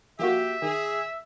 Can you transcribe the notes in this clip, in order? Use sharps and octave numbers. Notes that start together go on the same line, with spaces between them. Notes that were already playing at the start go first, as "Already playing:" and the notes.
F3 A#3 F#4 G4 E5
D#3 G#4